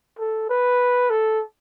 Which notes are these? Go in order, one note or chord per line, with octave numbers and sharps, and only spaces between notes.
A4
B4
A4